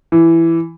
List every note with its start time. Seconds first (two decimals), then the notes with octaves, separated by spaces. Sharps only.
0.12 E3